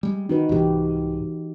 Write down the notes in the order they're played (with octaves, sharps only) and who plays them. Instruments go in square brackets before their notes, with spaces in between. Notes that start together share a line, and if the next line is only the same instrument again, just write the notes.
[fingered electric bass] G3 G#3
[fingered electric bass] D#3 [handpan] D#4 F#4 B4
[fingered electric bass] C2 G#2 [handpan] E3 G4